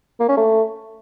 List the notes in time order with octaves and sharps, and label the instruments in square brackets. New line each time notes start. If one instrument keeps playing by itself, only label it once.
[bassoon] A#3
C#4
A3